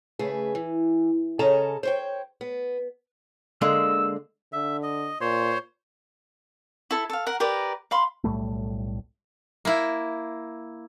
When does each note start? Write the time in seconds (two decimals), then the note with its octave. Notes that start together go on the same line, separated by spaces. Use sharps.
0.19 C#3 A3 G#4 B4
0.55 E3
1.39 C#3 C#4 A4 D#5 A5 A#5
1.83 C5 C#5 G5
2.41 B3
3.61 D3 G#3 A#3 E6
4.53 D3 E5
4.83 D#5
5.21 A#2 C5 C#5 C6
6.91 E4 A4
7.10 A4 F5
7.26 A#4 F#5
7.40 G4 A#4 B4 D5
7.91 F5 B5 C6
8.24 B1 A2 G3 A3
9.65 A#3 E4